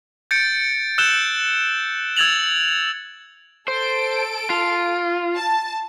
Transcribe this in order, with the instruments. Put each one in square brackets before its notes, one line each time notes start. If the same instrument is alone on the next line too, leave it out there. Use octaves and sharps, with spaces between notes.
[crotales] G6 A6 C#7 D7
E6 F#6 G6 E7 G7
E6 G#6 A6 F7 F#7
[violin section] A4 D7 [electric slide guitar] C5
[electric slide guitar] F4
[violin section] A5